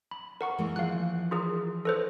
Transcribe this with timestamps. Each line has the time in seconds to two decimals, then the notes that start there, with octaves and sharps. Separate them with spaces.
0.11 B5
0.41 A#4 F#5 C#6
0.58 E3 G#3 A#3
0.76 E3 F3 F5 F#6
1.31 F4 G#4 A#4
1.85 A4 B4 C5